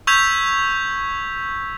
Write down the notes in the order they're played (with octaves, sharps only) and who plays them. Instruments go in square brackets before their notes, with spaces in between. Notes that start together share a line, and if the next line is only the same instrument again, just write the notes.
[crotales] C#6 E6 G6 G#6 B6 F7